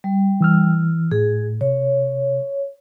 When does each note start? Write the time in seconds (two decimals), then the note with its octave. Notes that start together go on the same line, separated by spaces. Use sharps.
0.04 G3
0.41 E3 E6 F6
1.12 A2 G#4
1.61 C3 C#5